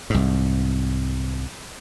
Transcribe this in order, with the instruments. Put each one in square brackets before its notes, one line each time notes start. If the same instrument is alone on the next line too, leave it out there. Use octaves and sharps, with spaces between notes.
[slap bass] C2 G#2